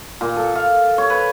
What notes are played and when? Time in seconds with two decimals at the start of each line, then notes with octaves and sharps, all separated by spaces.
0.21 A#2
0.36 A4
0.55 F5
0.98 C#5
1.10 B4